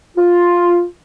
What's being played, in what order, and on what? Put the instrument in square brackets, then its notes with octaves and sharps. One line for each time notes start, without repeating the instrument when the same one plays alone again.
[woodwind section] F4